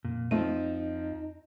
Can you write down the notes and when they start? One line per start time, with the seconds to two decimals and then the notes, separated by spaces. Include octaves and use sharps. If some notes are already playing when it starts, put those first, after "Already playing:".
0.05 F2 A#2
0.31 F3 A3 C4 D#4 D#7